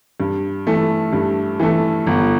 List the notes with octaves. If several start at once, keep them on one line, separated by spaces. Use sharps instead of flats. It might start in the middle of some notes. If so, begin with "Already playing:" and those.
G2
E3 A3
G2
E3 A3
G1